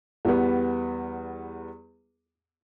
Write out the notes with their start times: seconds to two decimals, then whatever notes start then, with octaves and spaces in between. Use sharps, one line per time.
0.25 E2 G3 B3